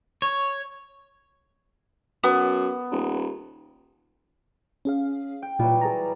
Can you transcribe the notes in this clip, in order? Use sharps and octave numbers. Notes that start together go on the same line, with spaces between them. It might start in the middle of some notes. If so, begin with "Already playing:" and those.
C#5
F#2 B3
D#1
C#4 G#4 F5
G5
A#2 E3 F#3 G3 F4
G#4 A5 A#5